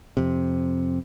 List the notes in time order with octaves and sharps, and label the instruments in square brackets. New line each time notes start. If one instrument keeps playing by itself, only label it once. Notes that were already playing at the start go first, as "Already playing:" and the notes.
[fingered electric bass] F2 C3